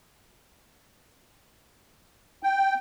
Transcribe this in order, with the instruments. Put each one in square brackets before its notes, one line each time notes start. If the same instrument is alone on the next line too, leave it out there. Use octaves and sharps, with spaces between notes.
[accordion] G5